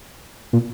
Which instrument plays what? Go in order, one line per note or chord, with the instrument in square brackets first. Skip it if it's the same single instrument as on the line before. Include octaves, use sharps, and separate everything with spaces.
[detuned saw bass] A#2